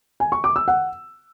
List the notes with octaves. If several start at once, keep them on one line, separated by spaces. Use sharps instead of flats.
G#5
C#6
D6
E6
F#5